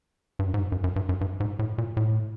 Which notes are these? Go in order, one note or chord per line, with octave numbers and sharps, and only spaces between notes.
G2
F#2
G#2
G2
F#2
F#2
G2
F#2
G2
G#2
A2
A#2
A2